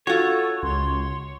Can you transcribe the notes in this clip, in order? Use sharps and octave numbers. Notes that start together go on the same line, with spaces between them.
F4 F#4 A4 C#5
C#2 C6